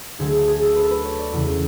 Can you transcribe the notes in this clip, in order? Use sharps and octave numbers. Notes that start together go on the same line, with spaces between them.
D2 D3 F#3 A3 G#4
G#4
A4
B4
A4
B4
C#5
D5
E2 C#3 G#3